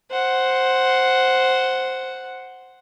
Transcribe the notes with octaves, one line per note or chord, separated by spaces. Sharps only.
C5 F#5